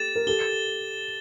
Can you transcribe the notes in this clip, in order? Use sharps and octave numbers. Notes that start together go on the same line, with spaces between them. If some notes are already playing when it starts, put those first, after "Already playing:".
Already playing: G4 A4 A6 E7
A#4
G4 A4 G7